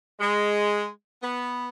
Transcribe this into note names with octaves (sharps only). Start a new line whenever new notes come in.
G#3
B3